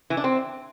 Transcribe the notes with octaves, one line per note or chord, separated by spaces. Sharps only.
E3
D4
C4